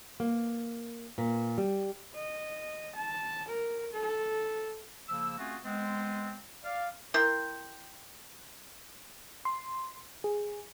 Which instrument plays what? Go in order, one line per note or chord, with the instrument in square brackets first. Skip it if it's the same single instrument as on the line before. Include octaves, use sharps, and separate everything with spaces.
[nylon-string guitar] A#3
A#2
G3
[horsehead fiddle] D#5
A5
A#4
A4
[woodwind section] C#3 F3 A#3 E6
A3 C4 C#4 F4 F#4 G#4
G#3 B3 C4
D5 F5
[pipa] E4 A#4 G5 C6
[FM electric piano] C6
G#4